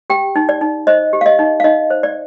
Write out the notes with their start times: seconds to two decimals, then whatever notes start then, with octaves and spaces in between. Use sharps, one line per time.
0.10 G4 G5
0.36 D#4
0.49 D5
0.61 D#4
0.87 C5 D#5
1.13 G4
1.21 F5
1.26 D#5
1.39 D#4
1.60 F5
1.64 D#4 D#5
1.90 C5
2.03 D5